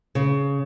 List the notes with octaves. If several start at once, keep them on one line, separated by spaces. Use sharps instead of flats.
C#3